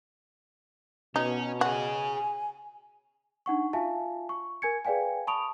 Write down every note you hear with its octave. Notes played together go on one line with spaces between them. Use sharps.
B2 C#4 D#4
F#4 G#4 C#5 G#5
D4 D#4 F#5 C#6
F4 F#4 E5 F5 G#5 A5
C#6
A#4 G#5 G#6 C#7
G#4 B4 D5 F5 G5 G#5
A5 B5 C#6 D#6 D7 F7